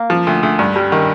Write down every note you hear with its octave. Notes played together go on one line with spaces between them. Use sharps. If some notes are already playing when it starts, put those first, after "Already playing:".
Already playing: A#3
F3
D2
D2
G2
G3
D#3